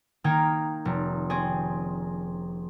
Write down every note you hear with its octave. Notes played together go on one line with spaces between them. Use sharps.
D#3 A#3 D#4 G5 A#5 G#6
F1
C4 C#4 G#4